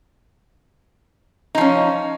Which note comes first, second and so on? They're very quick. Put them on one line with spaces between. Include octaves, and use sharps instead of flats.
D#4 F3 C#4